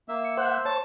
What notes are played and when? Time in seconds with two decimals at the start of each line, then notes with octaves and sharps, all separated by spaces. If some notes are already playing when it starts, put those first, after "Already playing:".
0.09 A#3 E5
0.24 C#7
0.37 C5 F#5
0.65 C#5 A5